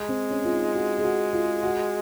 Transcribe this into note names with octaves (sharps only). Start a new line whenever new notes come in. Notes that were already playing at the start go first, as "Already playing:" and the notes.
Already playing: G#3
C4
C#4
F4
D#4
F#4
G#4
F#4
F4
F#4